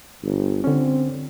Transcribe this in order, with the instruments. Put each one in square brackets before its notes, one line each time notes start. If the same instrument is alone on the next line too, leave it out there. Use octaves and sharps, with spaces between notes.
[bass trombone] G1
[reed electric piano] D3 C#4 [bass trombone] C4